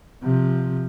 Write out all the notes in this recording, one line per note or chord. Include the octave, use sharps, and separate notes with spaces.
C3 F3